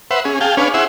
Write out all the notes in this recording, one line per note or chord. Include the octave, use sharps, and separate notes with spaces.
B4 C5 E5 F#5
C#4 G#4
G#4 F5 G5 A5
C#4 D4 B4 C#5 F5 G#5
E4 G#4 C5 E5 F#5